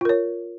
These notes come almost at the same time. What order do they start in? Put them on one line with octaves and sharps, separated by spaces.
F4 A#4 C#5